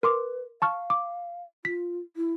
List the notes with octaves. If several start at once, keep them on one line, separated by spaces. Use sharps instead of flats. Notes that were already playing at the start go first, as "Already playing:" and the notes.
A#4 B4 C6 D6
F5 A5 C#6 F6
D6
F4 B6
E4